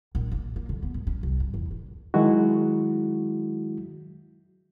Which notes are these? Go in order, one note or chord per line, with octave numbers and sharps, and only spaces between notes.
A#1
A#3
A#3
D3
B3
G#1
C#4
C2
G2
E2
D3
D#3 F#3 G#3 E4 F#4